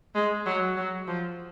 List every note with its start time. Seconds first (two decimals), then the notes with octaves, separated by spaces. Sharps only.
0.15 G#3
0.46 F#3
0.77 F#3
1.07 F3